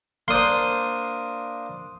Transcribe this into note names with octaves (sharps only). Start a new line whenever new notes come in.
A#3 D4 C5 C6 D#6